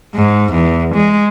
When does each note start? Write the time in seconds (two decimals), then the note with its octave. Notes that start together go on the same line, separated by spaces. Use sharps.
0.15 G#2
0.52 E2
0.95 G#3